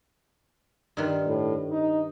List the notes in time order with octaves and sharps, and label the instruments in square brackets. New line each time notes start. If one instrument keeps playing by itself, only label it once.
[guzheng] G2 D#3 F4
[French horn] A2
D#4